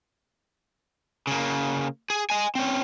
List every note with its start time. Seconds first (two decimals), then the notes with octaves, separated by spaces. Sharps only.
1.27 C#3 A#3
2.10 G#4
2.30 D#5 G#5
2.55 C4 C#4